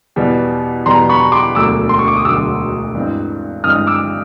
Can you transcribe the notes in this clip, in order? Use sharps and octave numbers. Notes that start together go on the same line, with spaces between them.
E2 B2 G3 B3
E2 B2 G3 B3 A#5 C6
B5 C#6
C6 D6
E1 D2 D3 F#3 D6 E6
C6
C#6
D6
D#6
E1 D2 D3 F#3 D6 E6
G2 E3 G#3 C4
G2 E3 G#3 C4 D#6 F6
D6 E6